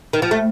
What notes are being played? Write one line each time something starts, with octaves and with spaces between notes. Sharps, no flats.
D#3
F3
A3